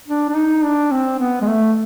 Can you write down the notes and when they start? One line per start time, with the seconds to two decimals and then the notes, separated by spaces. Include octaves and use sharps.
0.08 D4
0.29 D4
0.35 D#4
0.63 D4
0.91 C4
1.19 B3
1.41 G#3
1.47 A3